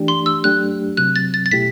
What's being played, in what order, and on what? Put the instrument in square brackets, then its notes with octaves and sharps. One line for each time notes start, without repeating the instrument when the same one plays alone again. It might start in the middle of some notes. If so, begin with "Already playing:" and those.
Already playing: [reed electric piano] E3 A3 D4 G4
[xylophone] C6
E6
[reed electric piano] F#3 A3 D4 G4 [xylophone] F#6
[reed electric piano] C3 F#3 C4 [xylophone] F#6
[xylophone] A6
A6
A6
[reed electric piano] B2 A3 E4 G4 [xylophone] B6